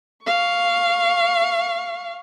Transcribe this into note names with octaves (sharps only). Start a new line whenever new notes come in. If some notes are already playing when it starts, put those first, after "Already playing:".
F5 C#6